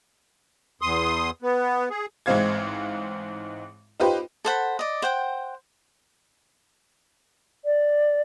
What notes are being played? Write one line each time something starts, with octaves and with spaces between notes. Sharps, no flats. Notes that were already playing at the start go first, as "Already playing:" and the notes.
E2 C6 D#6
B3
G#4
A1 G#2 G#3 C4 F5 G#6
D#4 F4 G4 B4 C5
A4 C5 F#5 B5
D5 D#5
C5 F#5 G5
D5